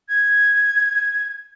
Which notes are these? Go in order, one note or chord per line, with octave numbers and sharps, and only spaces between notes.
G#6